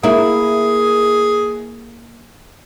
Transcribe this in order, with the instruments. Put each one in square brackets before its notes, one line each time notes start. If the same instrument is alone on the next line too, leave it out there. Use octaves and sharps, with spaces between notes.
[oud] A#3 E4 [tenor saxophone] G#4